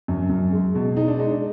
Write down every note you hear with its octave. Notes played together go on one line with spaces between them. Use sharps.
F#2
F#2
G#3
B2
G#3 D#4
D4
G#3 D#4
D4